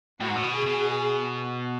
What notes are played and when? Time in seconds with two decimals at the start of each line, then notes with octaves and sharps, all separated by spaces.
0.20 A2 F#4
0.28 G#2
0.36 A2
0.43 B2
0.54 G#4
0.66 B2